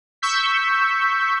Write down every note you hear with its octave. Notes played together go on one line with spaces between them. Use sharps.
C#6 E6 G6 B6